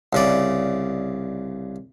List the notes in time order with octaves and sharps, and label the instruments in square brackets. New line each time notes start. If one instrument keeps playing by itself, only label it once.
[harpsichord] C2 C#3 D5